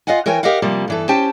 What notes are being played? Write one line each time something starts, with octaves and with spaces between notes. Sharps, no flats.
F4 D#5 F5 F#5 G#5
E3 A#4 C#5 G5 G#5
G4 A#4 D#5 F5 F#5
C3 F3 G3 A#3
G2 E3 A4
C#4 G4 C5 G5 A5